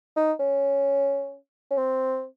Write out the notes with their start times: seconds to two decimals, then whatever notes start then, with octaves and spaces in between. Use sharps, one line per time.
0.16 D#4
0.39 C#4
1.71 C#4
1.77 C4